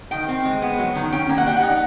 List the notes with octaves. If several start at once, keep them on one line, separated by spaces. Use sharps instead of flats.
D#3 G5
C4
G#3
B3
F#3
D#3
C#4 G5
A#3
F#5
G3 G5
F#5
D#4